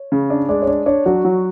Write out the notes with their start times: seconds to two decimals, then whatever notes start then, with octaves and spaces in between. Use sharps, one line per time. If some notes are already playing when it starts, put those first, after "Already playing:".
Already playing: C#5
0.12 C#3
0.30 D4
0.49 G#3 D5
0.62 C#5
0.67 D4 D5
0.86 D4 C#5
1.06 F#3 F#4
1.24 F#3